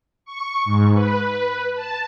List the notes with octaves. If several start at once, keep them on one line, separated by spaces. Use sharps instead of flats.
C#6
G#2
B4
A5